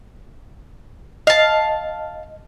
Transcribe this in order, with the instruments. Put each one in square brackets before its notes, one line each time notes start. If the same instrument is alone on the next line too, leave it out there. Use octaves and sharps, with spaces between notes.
[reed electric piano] D#5 [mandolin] F5 A5